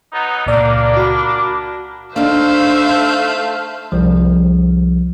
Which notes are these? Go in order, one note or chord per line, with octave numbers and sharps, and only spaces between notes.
F#3 B3 D#4
C#2 A#2 A#3 D4 D5
F#4 B5
A3 D4 D#4 C5 E5 F5
C2 F3